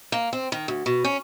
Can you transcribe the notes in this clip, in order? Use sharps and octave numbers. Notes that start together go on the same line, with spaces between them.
A#3
C4
D#3
D2
B2
C#4